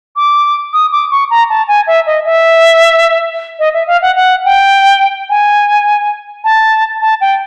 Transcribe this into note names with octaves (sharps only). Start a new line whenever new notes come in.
D6
D#6
D6
C#6
A#5
A5
G#5
E5
D#5
E5
D#5
E5
F5
F#5
F#5
G5
G#5
A5
A5
G5